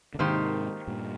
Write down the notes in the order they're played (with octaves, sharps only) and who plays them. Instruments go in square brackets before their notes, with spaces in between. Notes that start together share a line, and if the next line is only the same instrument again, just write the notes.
[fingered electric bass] D3
[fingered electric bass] G#2 C3 [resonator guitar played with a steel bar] D#3 A#3 D#4 G4 C5
[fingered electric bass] G2 A#2